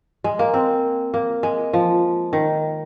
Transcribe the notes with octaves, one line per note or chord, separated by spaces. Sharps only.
G#3
A#3
C4
A#3
G#3
F3
D#3